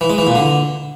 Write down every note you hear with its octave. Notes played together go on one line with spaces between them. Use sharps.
E3
G#3
E3
A#2
D3